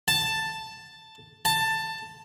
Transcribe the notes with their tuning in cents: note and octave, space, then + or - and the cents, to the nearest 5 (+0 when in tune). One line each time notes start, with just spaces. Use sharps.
A5 +5
A5 +10